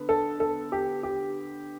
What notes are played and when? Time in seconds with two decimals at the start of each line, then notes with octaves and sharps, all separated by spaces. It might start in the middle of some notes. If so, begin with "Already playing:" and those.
Already playing: D3 B3
0.09 A4
0.40 A4
0.72 G4
1.03 G4